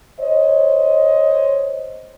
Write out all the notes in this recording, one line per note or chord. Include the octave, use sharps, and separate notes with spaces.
C5 C#5 D#5